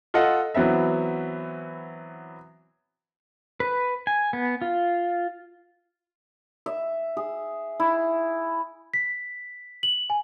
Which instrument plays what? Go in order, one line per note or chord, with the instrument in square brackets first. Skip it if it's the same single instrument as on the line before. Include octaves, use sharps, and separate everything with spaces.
[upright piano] F4 A4 D#5 F#5
E3 F#3 B3 C4 E5
[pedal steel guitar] B4
G#5
B3
F4
[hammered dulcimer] E5
G#4
E4
[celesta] B6
F#7
G#5